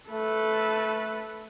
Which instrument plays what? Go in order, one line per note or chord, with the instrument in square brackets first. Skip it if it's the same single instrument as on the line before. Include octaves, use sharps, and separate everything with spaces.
[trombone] A3 [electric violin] A4 B4